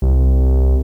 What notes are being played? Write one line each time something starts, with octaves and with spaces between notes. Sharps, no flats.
C2